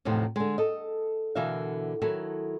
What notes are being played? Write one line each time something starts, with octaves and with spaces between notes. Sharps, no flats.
E2 A2 C3 F3 D#4
D3 G#3
A4 D#5
B2 D3 E3 A#4 E5 F5
D#3 F#3 E4 A4